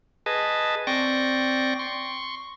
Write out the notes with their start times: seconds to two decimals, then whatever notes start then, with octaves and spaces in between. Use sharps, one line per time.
0.26 G#4 B4 D#5 A5
0.87 C4 D5 G5 C#6 A#6
1.79 C6 C#6